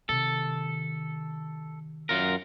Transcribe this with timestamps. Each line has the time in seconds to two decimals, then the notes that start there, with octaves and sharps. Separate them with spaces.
0.09 C3 D#3 A4
2.09 F#2 F4 A#4